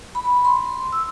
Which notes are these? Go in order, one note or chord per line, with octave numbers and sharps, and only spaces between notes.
B5
C6
E6